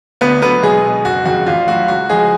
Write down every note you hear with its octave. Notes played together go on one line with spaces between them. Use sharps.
D2 B3 B4
D3 F#3 B3 B4
B1 G#3 G#4
B2 G#3
F#1 F#4
F2 C#3 G#3 F#4
A1 F4
A2 F#3 F#4
C#2 F#4
C#3 F3 G#3 G#4